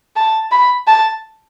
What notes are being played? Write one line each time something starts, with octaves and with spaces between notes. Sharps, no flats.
A5
B5
A5